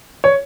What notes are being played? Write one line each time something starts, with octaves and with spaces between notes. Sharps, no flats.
C#5